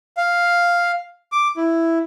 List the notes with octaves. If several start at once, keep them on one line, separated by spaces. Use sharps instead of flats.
F5
D6
E4